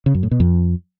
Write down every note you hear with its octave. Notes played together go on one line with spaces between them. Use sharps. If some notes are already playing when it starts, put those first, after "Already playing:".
C#3
F#2
A2
B2
F2